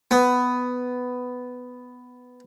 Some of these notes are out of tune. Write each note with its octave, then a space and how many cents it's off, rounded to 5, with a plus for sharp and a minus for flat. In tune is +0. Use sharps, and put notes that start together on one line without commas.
B3 +10